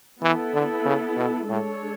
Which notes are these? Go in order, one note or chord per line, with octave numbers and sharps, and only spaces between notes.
E3 B3 E4 A4
D3
C#3
B2
A2 G#3 D4 A4 C#5